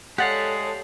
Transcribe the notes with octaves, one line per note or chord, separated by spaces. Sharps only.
G#3 G4 A4 C#5 D5 F5 F#5